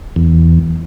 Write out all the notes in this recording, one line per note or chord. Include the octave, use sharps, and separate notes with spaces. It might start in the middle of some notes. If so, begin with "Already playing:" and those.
E2